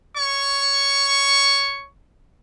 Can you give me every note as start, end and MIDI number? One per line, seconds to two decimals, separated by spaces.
0.17 1.87 73
0.17 1.87 85